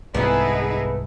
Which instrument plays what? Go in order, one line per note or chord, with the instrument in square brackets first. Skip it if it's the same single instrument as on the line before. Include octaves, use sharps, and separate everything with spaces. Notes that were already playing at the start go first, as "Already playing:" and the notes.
[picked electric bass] C2 G#2 [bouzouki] A3 B3 [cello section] D#4 E4 G#4